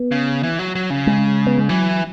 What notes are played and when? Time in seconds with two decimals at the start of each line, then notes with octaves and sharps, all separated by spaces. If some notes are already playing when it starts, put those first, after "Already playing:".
Already playing: B3
0.12 C#3
0.43 E3
0.59 F#3
0.75 F#3
0.90 C#3
1.07 G#3
1.47 B3
1.58 G#3
1.69 E3 F#3